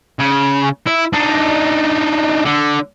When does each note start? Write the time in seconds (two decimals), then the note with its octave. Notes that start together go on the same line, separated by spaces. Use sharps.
0.19 C#3
0.86 E4
1.13 D4 D#4
2.45 D3